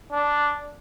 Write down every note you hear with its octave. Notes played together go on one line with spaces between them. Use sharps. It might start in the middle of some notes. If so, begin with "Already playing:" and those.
D4